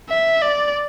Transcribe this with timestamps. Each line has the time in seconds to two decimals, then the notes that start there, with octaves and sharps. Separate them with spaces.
0.09 E5
0.42 D5